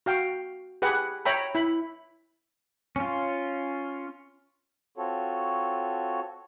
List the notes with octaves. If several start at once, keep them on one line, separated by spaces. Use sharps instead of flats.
F#4 F5 G5
G4 G#4 B4 F#5
C#5 E5 G5 A#5 B5
E4 B5
C#4 F4
C4 F4 F#4 A4 C#5